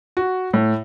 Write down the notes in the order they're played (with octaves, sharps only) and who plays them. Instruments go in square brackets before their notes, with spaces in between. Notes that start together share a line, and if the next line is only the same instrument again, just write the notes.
[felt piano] F#4
A2